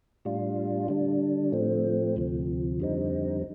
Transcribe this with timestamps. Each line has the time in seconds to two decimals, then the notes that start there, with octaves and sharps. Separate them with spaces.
0.25 A2 G3 D4 F4
0.88 D3 G3 D4
1.52 A2 F3 A3 C4
2.16 D2 C3 F3
2.80 F2 D3 G3 C4 D#4